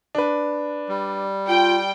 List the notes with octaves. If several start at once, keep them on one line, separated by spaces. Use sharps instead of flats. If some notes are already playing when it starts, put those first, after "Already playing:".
D4 B4
G3
F4 G5